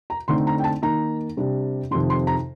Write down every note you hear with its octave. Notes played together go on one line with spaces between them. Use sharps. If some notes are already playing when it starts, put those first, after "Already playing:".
A#5
D3 A3 C4 D#4 C6
A#5
G5
A5
D#3 A#3 D#4 A#5
C3 G3 D4
F2 C3 D#3 C6
C6
A#5